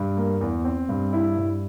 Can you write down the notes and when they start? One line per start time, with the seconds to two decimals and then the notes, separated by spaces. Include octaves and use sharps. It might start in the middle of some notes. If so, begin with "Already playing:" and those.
Already playing: G2
0.17 A#3
0.41 E2
0.65 C4
0.89 G2
1.13 E4
1.37 G2